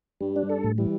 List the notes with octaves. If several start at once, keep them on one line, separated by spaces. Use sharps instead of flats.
G2 G3
D4
A4
A2
E3 G3